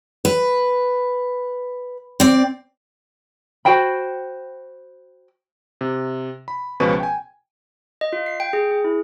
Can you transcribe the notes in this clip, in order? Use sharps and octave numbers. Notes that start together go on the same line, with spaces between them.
B4
C4 D5
F#4 C5 G5 B5
C3
B5
C#2 B2 F3 C#4 B4 C#6
G5 G#5
D#5
F4
C7
G5
G#4
G#4
E4